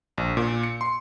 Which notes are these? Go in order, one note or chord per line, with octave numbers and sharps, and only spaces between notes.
A#1
A#2
C#7
C6